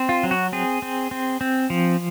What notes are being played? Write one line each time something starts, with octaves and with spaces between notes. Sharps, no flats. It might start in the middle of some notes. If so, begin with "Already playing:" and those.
Already playing: C4
F4
F#3
F#4
C4 G#4
C4
C4
C4
F3